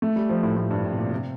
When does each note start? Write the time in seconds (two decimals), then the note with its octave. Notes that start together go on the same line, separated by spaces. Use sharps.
0.02 A3
0.16 G3
0.29 F3
0.43 A2
0.57 A2
0.71 G2
0.84 A2
0.92 C3
0.98 A#2
1.11 C3